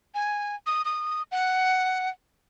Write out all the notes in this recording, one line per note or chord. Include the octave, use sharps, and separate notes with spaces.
G#5
D#6
D#6
F#5